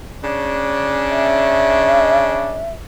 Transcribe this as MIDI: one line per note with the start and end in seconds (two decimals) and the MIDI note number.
0.23 2.67 49
0.23 2.67 61
0.23 2.67 62
1.09 2.70 76